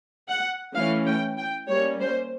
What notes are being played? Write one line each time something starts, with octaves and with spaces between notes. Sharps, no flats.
F#5
E3 A3 C#4 F5
G5
G5
G3 A#3 C#4 C#5
C5